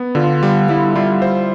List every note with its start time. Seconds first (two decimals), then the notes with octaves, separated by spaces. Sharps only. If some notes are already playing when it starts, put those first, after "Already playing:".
Already playing: B3
0.15 D3 F4
0.43 G3
0.69 G3 E4
0.96 G3 F4
1.22 C5